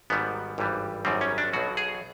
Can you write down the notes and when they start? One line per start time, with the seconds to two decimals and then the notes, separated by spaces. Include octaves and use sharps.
0.10 G#1 G#2 D#3 G3 B3
0.58 G#1 G2 E3 G3
1.05 G#1 F#2 D#3 G3 C4
1.21 C#4
1.38 D4
1.53 B1 B2 F#3 F#4
1.77 G#4